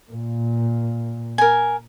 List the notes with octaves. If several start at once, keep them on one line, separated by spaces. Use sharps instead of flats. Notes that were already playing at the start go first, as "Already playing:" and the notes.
A#2
A#4 G#5